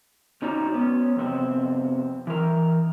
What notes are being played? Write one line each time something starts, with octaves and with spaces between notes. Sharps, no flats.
G#2 C#4 D#4 F#4 D5 A#5
B3 C#4
F2 C3 B3 C4
E3 A#4